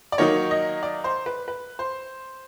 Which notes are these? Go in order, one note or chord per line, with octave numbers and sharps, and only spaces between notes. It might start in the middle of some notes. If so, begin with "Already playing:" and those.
D5
D#3 F#3 A#3 D#4 C#5
D#5
D5
C5
B4
B4
C5